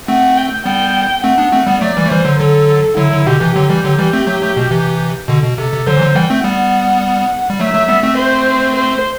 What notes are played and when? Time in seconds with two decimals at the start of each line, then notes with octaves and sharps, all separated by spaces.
0.08 A3 C4 F#5
0.37 G5
0.65 G3 B3 G5
1.24 A3 C4 F#5
1.38 B3 D4
1.52 A3 C4
1.67 G3 B3
1.81 F#3 A3 D5
1.97 E3 G3
2.06 A3
2.10 E3 G3 C5
2.25 D3 F#3
2.39 D3 F#3 A4
2.97 D3 F#3 E4
3.11 D3 F#3
3.26 B2 D3 G4
3.40 C3 E3
3.56 D3 F#3 G4
3.69 E3 G3
3.84 D3 F#3
3.98 E3 G3
4.13 A3 C4
4.27 F#3 A3
4.42 F#3 A3
4.57 B2
4.71 C3 E3
5.28 B2 D3
5.44 B2
5.58 C3 A4
5.72 C3
5.86 D3 F#3 C5
5.97 E3
6.01 D3 F#3
6.15 E3 G3 G5
6.30 A3 C4
6.44 G3 B3 F#5
7.50 G3
7.60 F#3 A3 E5
7.74 F#3 A3
7.88 G3 B3
8.03 A3 C4
8.17 C5
8.76 C5